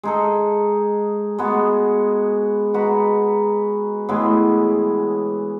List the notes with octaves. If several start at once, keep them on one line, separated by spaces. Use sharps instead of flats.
G#3 D#4 A4
G#3 B3 F#4
G#3 D#4 F#4 B4
A2 E3 G#3 B3